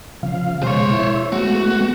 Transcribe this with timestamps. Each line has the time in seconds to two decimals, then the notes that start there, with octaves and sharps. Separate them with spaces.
0.23 C#3 F3 F5
0.63 B2 G#3 C5 C#5
0.91 E4 E5
1.32 G#3 A3 B3 F#4